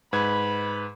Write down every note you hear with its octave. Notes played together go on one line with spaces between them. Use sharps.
G#2 B4 B5 G#6